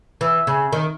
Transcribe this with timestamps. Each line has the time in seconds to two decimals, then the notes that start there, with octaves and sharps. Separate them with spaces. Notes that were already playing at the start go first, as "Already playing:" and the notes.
0.21 E3
0.47 C#3
0.73 D#3